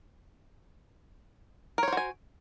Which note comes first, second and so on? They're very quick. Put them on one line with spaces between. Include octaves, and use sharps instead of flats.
A#4 C#5 C5 F#4 G#5